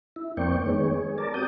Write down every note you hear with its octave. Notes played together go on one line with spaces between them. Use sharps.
E4
F2 A#3 C4 D5 G5 C#6
D#3 G#3 B3 C#5
G#4
A#4 D5 A5
C4 F#4 G4 D#6 G6